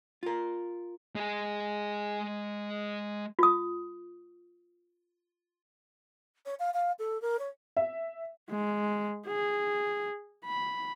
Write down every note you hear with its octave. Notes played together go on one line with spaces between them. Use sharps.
F4 A#4
G#3 G#4
F4 D#6
C#5
F5
F5
A4
A#4
C#5
E5
G#3
G#4
B5